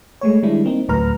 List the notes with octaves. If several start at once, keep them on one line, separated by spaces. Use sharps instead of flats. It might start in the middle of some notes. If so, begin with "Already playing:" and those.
G#3 A3 C#5
D#3 G3 G#3 D4 E4
A#3 C4 D#4
D2 A2 F#3 B4 A#5 F6